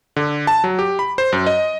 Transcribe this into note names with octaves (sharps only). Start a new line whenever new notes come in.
D3
A5
F#3
G4
B5
C5
F#2
D#5